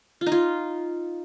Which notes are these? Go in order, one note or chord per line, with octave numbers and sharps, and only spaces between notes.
F4
D#4
F4